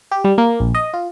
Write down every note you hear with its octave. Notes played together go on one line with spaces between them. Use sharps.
G4
G3
A#3
A#1
D#5
F4